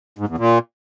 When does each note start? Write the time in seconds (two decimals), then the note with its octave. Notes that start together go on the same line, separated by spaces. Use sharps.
0.18 G#2
0.28 E2
0.38 A#2